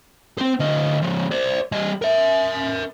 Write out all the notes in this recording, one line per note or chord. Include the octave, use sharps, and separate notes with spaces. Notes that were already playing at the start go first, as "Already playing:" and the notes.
C4 C5
D2 D#5
F3 G#3
C5 D5
G3 D#5
A#4 E5